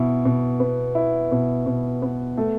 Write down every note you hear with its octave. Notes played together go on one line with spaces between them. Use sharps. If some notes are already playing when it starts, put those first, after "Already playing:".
Already playing: B2 E4
B2
B3
E4
B2
B2
B3
A3